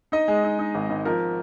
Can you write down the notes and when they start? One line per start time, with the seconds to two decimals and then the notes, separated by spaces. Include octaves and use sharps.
0.12 D#4 D#5
0.28 G#3
0.44 D#4
0.59 D#4
0.75 G#1
0.90 G#1
1.05 F3 A#4